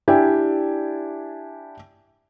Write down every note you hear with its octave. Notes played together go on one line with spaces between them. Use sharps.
D4 E4 G4 D5 G5 G#5